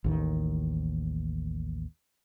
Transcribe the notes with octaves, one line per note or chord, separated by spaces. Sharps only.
A1 D#2 D#3